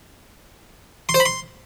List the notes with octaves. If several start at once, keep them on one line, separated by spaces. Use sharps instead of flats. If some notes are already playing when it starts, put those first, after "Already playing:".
C6
C5
B5
C6